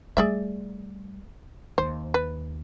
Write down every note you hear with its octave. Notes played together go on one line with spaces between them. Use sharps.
G3 A3 G#4 D5 E5
D#2 C5
B4